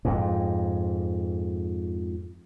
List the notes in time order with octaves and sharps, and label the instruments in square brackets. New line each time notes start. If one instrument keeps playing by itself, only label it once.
[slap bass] F2 G#2